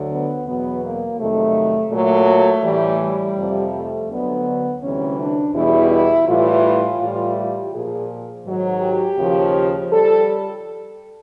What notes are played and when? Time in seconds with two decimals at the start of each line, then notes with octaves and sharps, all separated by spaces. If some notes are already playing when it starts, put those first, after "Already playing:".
Already playing: D2 D3 F#3
0.10 B3
0.47 E2 B2 F#3 B3
0.83 A#3
1.18 F2 C3 D#3 F#3 A3
1.92 A#2 F#3 A3
2.64 A2 E3 G3
3.01 G3
3.38 F2 C3 F3
3.74 A3
4.10 D2 D3 F#3 B3
4.82 D2 C3 E3 G3 C#4
5.19 D4
5.54 E2 B2 G3 E4
5.91 E4
6.28 A2 E3 G3 F4
7.00 A2 E3 G3 F4
7.37 G4
7.72 A#2 F3 G#4
8.46 G#2 D#3 F#3
8.82 G4
9.18 D#2 C#3 F3
9.91 G3 A4